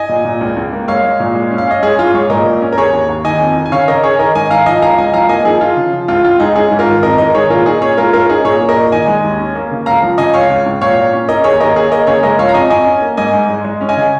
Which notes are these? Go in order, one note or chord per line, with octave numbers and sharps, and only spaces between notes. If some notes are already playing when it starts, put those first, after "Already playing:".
Already playing: D#5 G#5
A#2
A#2
C#2
C#2
A#3
G#3 C#5 F5
G#3
A#2
G#3
C#4
F5
C#4 D#5
G#3 G#4 C#5
G#2 F4
G#2 G#4 C#5
A#2 A#4 D#5
A#2
C#4
A#4
D#2 G#4 C#5
D#2
D#2
D#3 D#5 G#5
F2
D#3
G#5
C#3 C#5 F5
C#4 A#4 D#5
C#4 G#4 C#5
D#3 A#4 D#5
G#2 D#5 G#5
D#3 F5 A#5
F3 D#5 G#5
C#2 F5 A#5
C#2 D#5 G#5
F3 F5 A#5
A#3 D#5 G#5
F3 D#4 G#4
F3 F4
C#3
F3
C#2 F4
C#2 F4
G#3 D#4 G#4
C#4 D#4 G#4
G#2
F4 A#4
D#3
F2 A#4 D#5
G#3 A#4 D#5
D#3 G#4 C#5
A#2 F4 A#4
A#2 D#4 G#4
C#4 G#4 C#5
G#3 F4 A#4
C#4 F4 A#4
C#4 D#4 G#4
A#2 G#4 C#5
A#3
A#4 D#5
A#2
D#3 D#5 G#5
G#3
D#2
C#4
A#3
C#3
C#2 F5 A#5
F3
C#3 D#5 G#5
C#2 C#5 F5
C#2
C#2
A#2 C#5 F5
A#2
C#4
C#4 A#4 D#5
D#2 G#4 C#5
D#2 A#4 D#5
A#3 G#4 C#5
A#3 A#4 D#5
C#3 G#4 C#5
G#3 A#4 D#5
F3 C#5 F5
A#5
F2 D#5 G#5
F2 D#5 G#5
C#4
A#3
G#2 D#5 G#5
G#2
G#3
G#3
C#4
D#5 G#5
C#3